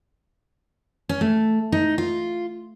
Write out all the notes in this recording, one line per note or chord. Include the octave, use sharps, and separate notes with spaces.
C#4
A3
D#4
F4